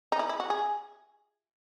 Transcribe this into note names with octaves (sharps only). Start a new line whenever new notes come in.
D#4
E4
E4
F#4
G#4